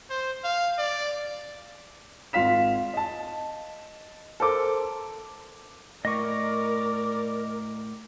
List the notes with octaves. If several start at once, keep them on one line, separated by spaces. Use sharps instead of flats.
C5
F5
D5
G#1 F4 F5 B6 E7
D#5 A5
A4 A#4 C5 D6
A2 A#4 D5 D#5 C#6